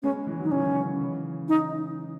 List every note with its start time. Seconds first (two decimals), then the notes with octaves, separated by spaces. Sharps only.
0.03 G#3 B3 C#4
0.27 E3 G#3
0.40 D#3 F#3
0.44 D#4
0.51 C#3 E3 C#4
1.01 C#3 E3
1.49 D#4